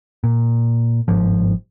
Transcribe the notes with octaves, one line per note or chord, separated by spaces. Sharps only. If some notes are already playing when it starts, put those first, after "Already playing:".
A#2
G1 G#2 F3